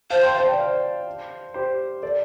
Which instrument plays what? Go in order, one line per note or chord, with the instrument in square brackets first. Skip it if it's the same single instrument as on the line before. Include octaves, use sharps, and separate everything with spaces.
[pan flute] C5 [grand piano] F5 A5
[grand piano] G5 C6
F5 A5
D5 G5
C5 F5
G4 C5
A4 D5